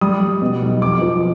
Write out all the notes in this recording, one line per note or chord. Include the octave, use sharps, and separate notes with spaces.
G3 D#6
G3
B2
B1
F2 D6
F3